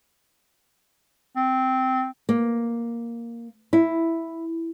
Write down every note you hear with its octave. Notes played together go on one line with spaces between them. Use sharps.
C4
A#3
E4